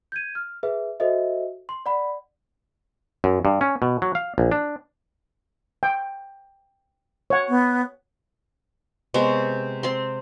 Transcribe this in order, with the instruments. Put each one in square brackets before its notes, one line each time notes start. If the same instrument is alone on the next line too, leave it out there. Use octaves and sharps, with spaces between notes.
[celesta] G6 G#6 D#7
F6
G#4 B4 E5
F#4 A4 C5 D#5 E5
C6
D5 F#5 B5
[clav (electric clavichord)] F#2
G2
C#4
B2
F#3
F5
A#1
D4
[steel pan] G5
C#5 F#5
[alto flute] B3
[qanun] C3 G#3 B3 C#5
C4 C6